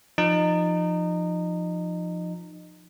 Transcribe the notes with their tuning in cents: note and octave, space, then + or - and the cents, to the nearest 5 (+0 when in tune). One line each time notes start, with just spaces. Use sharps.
F3 +0 D#4 -25